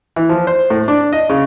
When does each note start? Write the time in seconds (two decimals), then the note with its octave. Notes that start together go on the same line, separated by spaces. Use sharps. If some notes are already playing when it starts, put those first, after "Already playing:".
0.16 E3
0.29 F3
0.47 C5
0.70 A2
0.88 D4
1.13 D#5
1.29 C#3